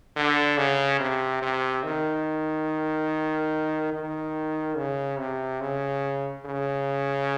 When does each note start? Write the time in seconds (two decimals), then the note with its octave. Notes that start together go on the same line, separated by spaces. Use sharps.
0.16 D3
0.58 C#3
1.00 C3
1.42 C3
1.84 D#3
3.93 D#3
4.77 C#3
5.19 C3
5.61 C#3
6.45 C#3